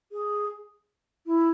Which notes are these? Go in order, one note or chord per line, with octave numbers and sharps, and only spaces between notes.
G#4
E4